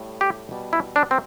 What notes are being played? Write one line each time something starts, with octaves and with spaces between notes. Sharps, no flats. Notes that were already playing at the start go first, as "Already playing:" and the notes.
Already playing: A2 G3
G4
B2 G3
E4
D4
C4